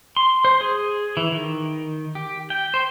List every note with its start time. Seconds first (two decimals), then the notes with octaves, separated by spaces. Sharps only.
0.17 C6
0.45 C5
0.61 G#4
1.17 E3
1.32 D#3
2.15 G4
2.50 G5
2.74 C5